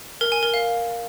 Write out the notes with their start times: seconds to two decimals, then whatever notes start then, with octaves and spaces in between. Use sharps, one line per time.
0.21 A#4
0.32 G#5
0.43 A#4
0.54 F5